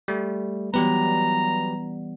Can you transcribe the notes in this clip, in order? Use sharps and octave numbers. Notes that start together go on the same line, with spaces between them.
G3 A3
E3 F#3 G3 B3 G4 B4 A#5